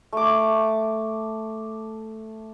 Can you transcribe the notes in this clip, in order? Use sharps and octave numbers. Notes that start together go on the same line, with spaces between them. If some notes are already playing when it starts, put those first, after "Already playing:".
A3 D6